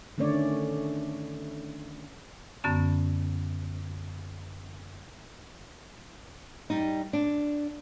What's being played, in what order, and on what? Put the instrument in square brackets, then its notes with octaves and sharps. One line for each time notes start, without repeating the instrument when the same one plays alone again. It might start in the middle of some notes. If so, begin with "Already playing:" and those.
[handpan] D3 D#3 A3 C#4 C#5 D5
[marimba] F#2 D3 B3 C#4 A5
[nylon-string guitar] G3 D#4
D4